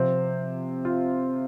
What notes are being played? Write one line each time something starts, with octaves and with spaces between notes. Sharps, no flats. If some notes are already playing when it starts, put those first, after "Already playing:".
Already playing: C3 F3 C4 C5
F4 F5